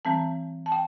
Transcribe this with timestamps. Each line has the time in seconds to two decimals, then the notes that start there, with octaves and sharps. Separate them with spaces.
0.05 E3 G3 C4 A5
0.66 A5
0.72 G5